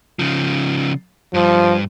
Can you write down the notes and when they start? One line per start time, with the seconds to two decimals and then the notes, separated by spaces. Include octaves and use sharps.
0.19 C#3 F3
1.34 G2 F3